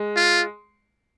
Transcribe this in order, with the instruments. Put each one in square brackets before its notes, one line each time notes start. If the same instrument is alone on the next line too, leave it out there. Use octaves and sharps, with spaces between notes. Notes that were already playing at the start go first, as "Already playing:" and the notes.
Already playing: [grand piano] G#3
[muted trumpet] F4